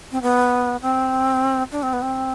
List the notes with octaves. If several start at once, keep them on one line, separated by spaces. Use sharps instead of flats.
C4
B3
C4
D4
C4
B3
C4